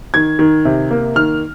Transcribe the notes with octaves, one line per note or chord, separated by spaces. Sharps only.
D#3 G#6
D#3
C3
A#3
D#3 F6